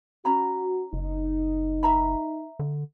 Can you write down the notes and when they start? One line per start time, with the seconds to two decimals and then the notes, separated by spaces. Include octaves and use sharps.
0.25 C#4 F#4 A#5 B5
0.93 F#1 D#4
1.83 E5 A#5 B5
2.59 D3